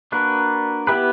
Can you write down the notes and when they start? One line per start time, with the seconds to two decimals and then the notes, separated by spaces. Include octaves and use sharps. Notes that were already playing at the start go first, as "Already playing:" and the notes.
0.12 A#3 D4 F#4 B4
0.87 B3 E4 G4 B4